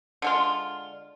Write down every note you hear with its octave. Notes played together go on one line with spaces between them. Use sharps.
D3 G#3 F4